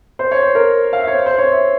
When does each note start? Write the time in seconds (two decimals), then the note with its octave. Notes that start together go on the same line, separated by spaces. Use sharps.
0.19 C5
0.31 C#5
0.43 C5
0.55 A#4
0.93 F5
1.00 E5
1.07 C#5
1.14 C5
1.26 C5
1.38 C#5
1.51 E5